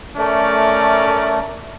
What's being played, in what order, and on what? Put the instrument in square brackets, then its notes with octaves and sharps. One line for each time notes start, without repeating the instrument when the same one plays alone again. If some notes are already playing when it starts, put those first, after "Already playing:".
[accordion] A3 [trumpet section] C#4 A#4 D5